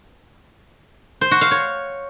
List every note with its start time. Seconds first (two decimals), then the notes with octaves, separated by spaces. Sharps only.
1.21 C5
1.31 F#4
1.41 F5
1.51 C#5